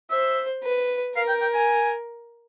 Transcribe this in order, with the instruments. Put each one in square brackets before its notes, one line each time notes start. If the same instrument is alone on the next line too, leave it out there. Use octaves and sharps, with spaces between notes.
[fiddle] C5 [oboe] E5
[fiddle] B4
[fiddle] A#4 [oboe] F5
[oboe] G5
G5
G#5